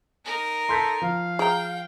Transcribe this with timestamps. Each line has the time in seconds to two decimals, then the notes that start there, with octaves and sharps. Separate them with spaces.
0.25 D#4 A#4
0.69 A4 C6 G6 B6
1.02 F3 F5
1.39 G#4 G5 A#5